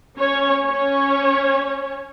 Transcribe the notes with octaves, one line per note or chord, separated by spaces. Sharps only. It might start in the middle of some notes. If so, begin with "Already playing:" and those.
C#4 C#5
C#4 C#5